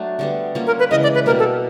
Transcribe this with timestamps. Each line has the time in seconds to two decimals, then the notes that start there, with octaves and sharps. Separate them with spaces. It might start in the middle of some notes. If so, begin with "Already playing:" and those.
Already playing: F#3 A3 D4
0.19 D3 G3 B3
0.55 G3 A#3 C#4 F4
0.67 A#4
0.79 B4
0.91 C#3 E3 G#3 D#5
1.03 D5
1.14 B4
1.26 B2 G3 A#3 A#4
1.39 A4